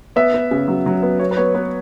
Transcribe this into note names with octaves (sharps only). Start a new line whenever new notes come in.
B3 E5
B3
C#3
F#3
F#3
B3
B3 C#5
B4
B3 C#5
B3 B4